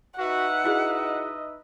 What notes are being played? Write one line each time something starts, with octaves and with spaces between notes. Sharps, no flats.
D#4 F#4 B4 E5 F#5
E4 F#4 G#4 D#5